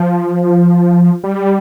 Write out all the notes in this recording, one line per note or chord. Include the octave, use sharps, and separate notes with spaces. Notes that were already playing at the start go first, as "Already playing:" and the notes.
Already playing: F3
G3